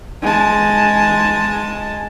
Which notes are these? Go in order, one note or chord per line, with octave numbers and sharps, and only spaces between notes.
G#3 A5